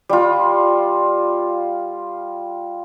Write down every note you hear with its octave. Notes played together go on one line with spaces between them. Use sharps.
G3 F4